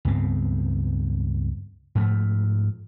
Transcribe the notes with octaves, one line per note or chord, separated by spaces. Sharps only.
C#2 G2 B3 C4
G#2 F3 A3